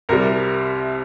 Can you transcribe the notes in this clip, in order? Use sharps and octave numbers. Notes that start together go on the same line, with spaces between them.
C2 C3 G3 A#4